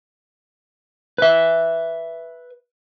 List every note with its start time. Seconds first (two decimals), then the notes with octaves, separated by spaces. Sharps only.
1.18 B4 E5